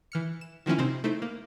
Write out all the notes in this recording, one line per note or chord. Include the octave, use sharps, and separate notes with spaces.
E3 F6 C#7
E7
D#3 F3 A#3 C#4 E4
C3 C4 D#4 C5
A3 D#4 E4 C5 D7
A#3